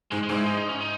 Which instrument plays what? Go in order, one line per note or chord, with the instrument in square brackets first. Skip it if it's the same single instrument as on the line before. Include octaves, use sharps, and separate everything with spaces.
[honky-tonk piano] G#2 [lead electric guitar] G#3
[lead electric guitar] G#3
[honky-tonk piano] G#2
[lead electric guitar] E4
D#4
D#4
C#4
D#4